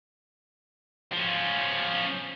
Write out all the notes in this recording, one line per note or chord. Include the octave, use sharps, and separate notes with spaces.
F3 C#4